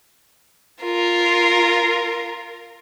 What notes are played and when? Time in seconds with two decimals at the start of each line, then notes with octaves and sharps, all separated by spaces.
0.83 F4 A#4